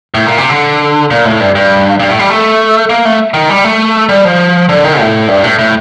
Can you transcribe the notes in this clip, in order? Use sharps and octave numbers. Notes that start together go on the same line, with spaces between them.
A2
A#2
C3
D3
A#2
A2
G2
G2
G2
A2
G3
A3
A#3
A3
D#3
G3
A3
G3
F3
D3
D#3
A2
G2
A2
A2